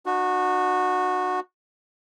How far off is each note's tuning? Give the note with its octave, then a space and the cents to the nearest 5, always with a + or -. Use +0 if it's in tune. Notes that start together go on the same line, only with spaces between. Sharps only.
D4 +40 F#4 -15